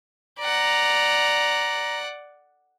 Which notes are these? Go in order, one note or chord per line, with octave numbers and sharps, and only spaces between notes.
D5 F#5 A#5